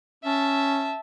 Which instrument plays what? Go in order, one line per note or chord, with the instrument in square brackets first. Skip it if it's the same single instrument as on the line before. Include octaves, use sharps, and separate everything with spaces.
[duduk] C#4 [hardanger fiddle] E5 A5